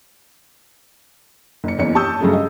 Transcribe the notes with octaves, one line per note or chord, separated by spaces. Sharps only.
F#1 C#7
F#1 E2 C#5 C#7
G4 A5 C#6 D#6 E6 G6
G2 C#3 F#3 G#3 A3
D#5